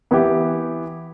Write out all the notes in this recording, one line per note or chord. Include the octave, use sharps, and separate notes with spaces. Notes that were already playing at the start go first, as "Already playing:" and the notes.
E3 B3 E4 G4